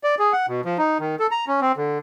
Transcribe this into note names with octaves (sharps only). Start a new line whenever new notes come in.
D5
G#4
F#5
B2
F3
D#4
D#3
A4
A#5
C#4
C4
D3